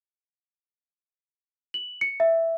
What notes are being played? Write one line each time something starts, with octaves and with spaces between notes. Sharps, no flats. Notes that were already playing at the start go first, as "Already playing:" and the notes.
F#7
C#7
E5